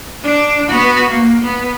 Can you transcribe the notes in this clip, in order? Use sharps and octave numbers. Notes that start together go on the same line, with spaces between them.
D4
B3 F#4
A#3
B3